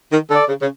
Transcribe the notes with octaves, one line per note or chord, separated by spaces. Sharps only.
D#3
D3 A4 D5
C#3
C#3